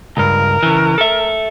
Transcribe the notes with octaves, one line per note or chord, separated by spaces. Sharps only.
C#2 G2 A#4
C#3 E3
A4 E5